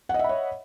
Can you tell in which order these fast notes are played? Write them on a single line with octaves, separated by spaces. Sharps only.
F#5 D#5 E5 B5 C#5